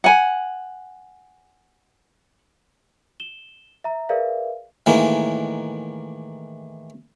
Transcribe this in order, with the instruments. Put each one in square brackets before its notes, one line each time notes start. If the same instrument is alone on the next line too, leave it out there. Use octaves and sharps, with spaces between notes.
[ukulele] F#5 G#5
[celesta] E7 G7
E5 A#5
G#4 A#4 B4 D5 E5 F5
[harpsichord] A2 D#3 E3 G#3 A#3